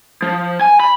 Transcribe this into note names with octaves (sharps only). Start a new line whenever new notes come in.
F3
G#5
B5